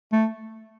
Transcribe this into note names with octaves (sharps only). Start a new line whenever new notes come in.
A3